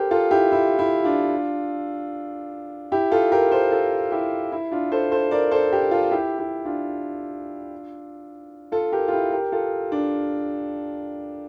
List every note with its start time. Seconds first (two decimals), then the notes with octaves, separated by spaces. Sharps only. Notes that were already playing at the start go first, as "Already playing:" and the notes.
Already playing: G4 A4 A#4 C5
0.11 F4 A4
0.31 E4 G4
0.52 E4
0.79 E4
1.04 D4 F4
2.92 E4 G4
3.11 F4 A4
3.32 G4 A#4
3.51 A4 C5
3.71 F4 A4
4.11 E4 G4
4.52 E4
4.71 D4 F4
4.92 A4 C5
5.12 A4 C5
5.31 A#4 D5
5.51 A4 C5
5.72 G4 A#4
5.91 F4 A4
6.11 E4 G4
6.39 E4 G4
6.65 D4 F4
8.72 F4 A4
8.92 G4 A#4
9.08 F4
9.12 E4 G4
9.32 G4 A#4
9.52 F4 A4
9.92 D4